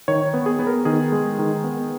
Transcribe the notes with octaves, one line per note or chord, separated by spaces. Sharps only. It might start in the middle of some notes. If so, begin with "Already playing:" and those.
D#3 C#5
B3
G#4
B3
A#4
D#3 G#4
G#3
D#3
B3